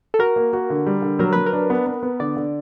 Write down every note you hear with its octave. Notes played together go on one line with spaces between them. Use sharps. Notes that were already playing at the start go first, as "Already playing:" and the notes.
A4
F#4 A#4
A#3
F#4
D3
G3
D3
F#3 A#4
F#3 B4
A#4
D4
B3
B3
B3
D3 D5
D3